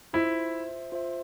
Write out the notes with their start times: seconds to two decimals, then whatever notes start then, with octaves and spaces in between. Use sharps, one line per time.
0.13 E4 F4 C5 E5
0.92 F4 C5 E5